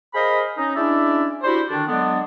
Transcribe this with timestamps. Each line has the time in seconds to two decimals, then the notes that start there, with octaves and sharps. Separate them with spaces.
0.14 G#4 A#4 C5 D#5 F5 B5
0.57 C#4 D#4
0.76 G#3 C#4 D4 E4 D5 E5
1.43 D4 E4 F#4 G4 C5
1.70 D3 D#3 D4
1.88 D3 F#3 G#3 B3 D4